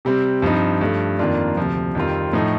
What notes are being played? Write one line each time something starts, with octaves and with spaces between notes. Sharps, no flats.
C3 G3 C4
G2 F3 C4 D#4
G2 F3 A3
F2 D#3 A#3 D4 F4
D2 C3 F3
F2 D#3 G3 C4 F4
A2 F3 A3 D#4